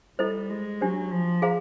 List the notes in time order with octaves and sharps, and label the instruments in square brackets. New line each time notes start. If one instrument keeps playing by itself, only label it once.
[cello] G3 [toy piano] E4 A4 C5 D#5
[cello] G#3
[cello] F#3 [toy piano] D4 G4 C5
[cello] F3
[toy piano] G#4 C5 F5 A#5